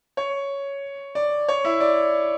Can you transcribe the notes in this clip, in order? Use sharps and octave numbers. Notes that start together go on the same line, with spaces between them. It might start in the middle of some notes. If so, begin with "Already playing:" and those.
C#5
D5
C#5
E4
D5